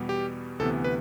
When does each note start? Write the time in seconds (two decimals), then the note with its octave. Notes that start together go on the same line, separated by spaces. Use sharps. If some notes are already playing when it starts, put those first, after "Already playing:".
Already playing: E2 B2 G3 B3
0.09 G4
0.59 D2 C3 E3 B3 A4
0.84 B4